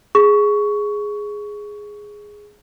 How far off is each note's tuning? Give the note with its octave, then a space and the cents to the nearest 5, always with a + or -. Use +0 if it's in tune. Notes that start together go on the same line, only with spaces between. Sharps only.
G#4 +0 C#6 +15